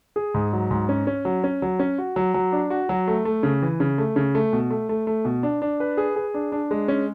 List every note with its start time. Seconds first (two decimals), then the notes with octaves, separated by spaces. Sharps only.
0.16 G#4
0.34 G#2
0.53 F#3
0.71 G#2
0.89 C#4
1.07 C#4
1.25 F#3
1.44 C#4
1.62 F#3
1.79 C#4
1.98 F#4
2.16 F#3
2.34 F#3
2.52 D4
2.70 F#4
2.89 F#3
3.08 A3
3.25 A3
3.43 C#3
3.62 E3
3.80 C#3
3.98 A3
4.16 C#3
4.35 A3
4.53 B2
4.70 A3
4.89 A3
5.07 A3
5.25 B2
5.43 D4
5.62 D4
5.80 B4
5.97 G#4
6.16 G#4
6.34 D4
6.52 D4
6.71 G#3
6.88 C#4